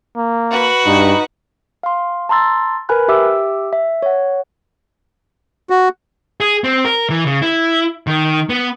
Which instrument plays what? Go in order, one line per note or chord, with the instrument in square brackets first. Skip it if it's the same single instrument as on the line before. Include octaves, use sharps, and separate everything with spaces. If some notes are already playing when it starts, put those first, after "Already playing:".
[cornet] A#3
[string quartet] F#4 B4
[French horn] G2 [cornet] D#4
[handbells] F5 C6
A5 A#5 C6 E6 A6
A#4 B4 G#5 B5 F#6
G4 E5 D6 E6
E5
C#5 F#5
[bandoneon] F#4
[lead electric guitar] G#4
C4
A#4
E3
C#3
E4
D#3
B3